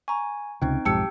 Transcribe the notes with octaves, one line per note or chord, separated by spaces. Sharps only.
G#5 A#5 C#6
C#2 C3 C4 D#4 G5
B1 F2 G#2 G4 G5 A5 E6 C#7